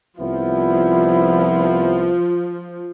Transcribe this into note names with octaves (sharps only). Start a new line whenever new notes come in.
C2 F3 B3 E4